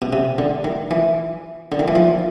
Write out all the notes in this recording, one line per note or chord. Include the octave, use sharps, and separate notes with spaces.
B2
C3
D3
D#3
E3
D3
D#3
E3
F3